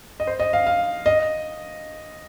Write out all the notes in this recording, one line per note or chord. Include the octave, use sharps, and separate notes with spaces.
D#5
C5
D#5
F5
F5
D#5